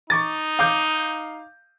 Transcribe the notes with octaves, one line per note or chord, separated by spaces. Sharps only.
D#4 C#6 D6 A6
F5 D6 G6